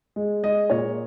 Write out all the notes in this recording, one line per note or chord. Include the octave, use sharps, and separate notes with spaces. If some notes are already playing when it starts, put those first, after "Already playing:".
G#3
G#3 D#5
A#2 C#5